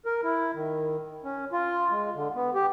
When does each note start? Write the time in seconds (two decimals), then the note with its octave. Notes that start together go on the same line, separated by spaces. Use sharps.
0.06 A#4
0.23 E4
0.54 D#3
1.25 C#4
1.52 F4
1.91 G#3
2.14 D3
2.35 B3
2.54 G4